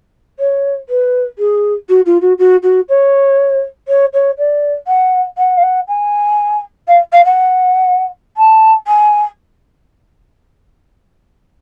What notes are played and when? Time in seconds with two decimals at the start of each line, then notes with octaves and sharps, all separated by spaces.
0.39 C#5
0.89 B4
1.39 G#4
1.89 F#4
2.06 F4
2.22 F#4
2.39 F#4
2.63 F#4
2.89 C#5
3.88 C#5
4.14 C#5
4.38 D5
4.87 F#5
5.38 F#5
5.57 F5
5.63 F#5
5.88 G#5
6.88 F5
7.13 F5
7.25 F#5
8.37 A5
8.87 G#5